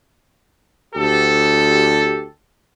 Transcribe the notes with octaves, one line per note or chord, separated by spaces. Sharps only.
D2 G4 A4